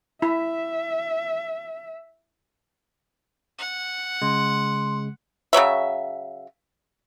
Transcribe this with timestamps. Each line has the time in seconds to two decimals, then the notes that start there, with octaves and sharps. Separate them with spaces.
0.22 E4 E5
3.58 F#5
4.22 C#3 G#3 C6
5.53 C#3 F#3 C#5 E5